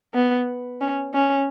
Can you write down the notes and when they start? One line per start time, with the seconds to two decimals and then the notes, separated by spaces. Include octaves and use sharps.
0.14 B3
0.81 C#4
1.14 C#4